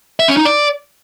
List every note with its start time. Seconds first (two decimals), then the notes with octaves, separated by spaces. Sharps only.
0.20 E5
0.28 C#4
0.37 D#4
0.45 D5